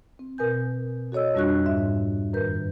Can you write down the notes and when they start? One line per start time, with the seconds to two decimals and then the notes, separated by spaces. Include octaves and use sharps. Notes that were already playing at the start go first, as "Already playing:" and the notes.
0.19 C4
0.38 B2 A#4 B4 G#5 G6
1.12 F#4 A4 C#5 D#5 E6
1.35 F2 G3 D4 F#4 C#6 F#6
1.66 G#2 E5
2.33 F#2 D#3 A#4 B4 G6